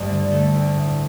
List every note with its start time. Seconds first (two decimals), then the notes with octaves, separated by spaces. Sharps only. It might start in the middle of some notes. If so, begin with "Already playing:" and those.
Already playing: D2 G2
0.10 D3
0.31 A3 A4
0.54 D2
0.76 A2